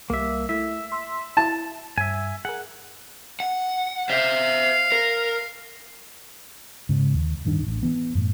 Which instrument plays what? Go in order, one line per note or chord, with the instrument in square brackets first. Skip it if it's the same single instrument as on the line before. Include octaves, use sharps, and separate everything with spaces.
[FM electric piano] C2 G3 [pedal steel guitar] A#3 E5
[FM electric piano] A3 E4 [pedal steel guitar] E5
[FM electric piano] C6 E6
[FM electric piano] E4 [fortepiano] A5
[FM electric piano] G2 [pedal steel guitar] E5 G#5
[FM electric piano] G#4 A#4 [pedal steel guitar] F#5
[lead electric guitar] F#5
[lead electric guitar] C5 E5 [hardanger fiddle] F5
[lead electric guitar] A#4
[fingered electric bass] G#2 C#3
D#2
D1 G2 D#3 D4
A1 B2
E3 B3
F#2 A2